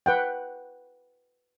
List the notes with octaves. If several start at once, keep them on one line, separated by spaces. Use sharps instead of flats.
B4 F#5 G5